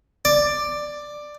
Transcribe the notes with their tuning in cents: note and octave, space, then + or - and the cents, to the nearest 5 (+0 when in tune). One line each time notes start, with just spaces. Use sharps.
D5 +10